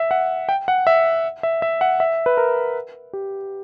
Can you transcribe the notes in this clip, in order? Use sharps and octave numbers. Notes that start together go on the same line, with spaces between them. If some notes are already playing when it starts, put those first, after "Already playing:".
Already playing: E5
F#5
G5
F#5
E5
E5
E5
F#5
E5
B4
A#4
G4